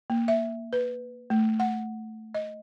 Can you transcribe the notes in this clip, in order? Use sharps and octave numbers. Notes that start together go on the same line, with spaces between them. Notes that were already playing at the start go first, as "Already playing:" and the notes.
A#3
E5
B4
A3
F#5
D#5